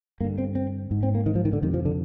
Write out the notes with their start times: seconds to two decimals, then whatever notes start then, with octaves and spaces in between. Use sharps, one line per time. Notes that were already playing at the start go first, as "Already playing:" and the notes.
0.20 G2 A#3
0.24 D3
0.38 C4
0.55 C4
0.91 G#2
1.03 C4
1.15 A#3
1.26 D#3
1.35 F3
1.45 D#3
1.53 D3
1.62 F2 C3 D#3
1.74 F3
1.85 D3